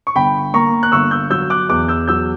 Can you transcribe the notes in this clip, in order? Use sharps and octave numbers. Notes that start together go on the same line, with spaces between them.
C#6
G1 G5 B5
A#3 A#5 C#6
F#6
G1 C#6 E6
E6 G6
F#3 E6 G6
D6 F#6
E2 D6 F#6
E6 G6
F#3 E6 G6